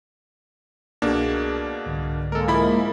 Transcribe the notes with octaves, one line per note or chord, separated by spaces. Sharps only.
C2 B2 A#3 D4 G#4
C2 G#2 D3
G#3 A#3 A4 A#4
F3 E4 B5